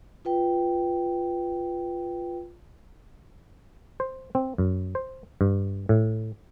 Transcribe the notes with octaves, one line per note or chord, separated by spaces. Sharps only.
F4 B4 G5
C5
C4
F#2
C5
G2
A2